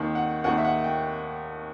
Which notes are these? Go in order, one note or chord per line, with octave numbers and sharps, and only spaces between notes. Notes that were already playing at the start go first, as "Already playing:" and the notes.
Already playing: D#2 D#3
F#5
D#2 D#3 F#5
E5
F#5
G5